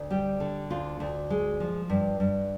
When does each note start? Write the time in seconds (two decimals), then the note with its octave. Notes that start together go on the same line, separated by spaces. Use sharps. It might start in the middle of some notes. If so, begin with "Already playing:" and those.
Already playing: D2
0.10 G3 G4
0.40 D3
0.70 D2 F4
1.00 D2
1.30 G#3
1.60 F3
1.89 G2
2.20 G2